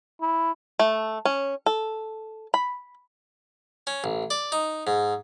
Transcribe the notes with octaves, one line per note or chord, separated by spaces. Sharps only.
E4
A3
C#4
A4
B5
C#4
A1
D5
D#4
G#2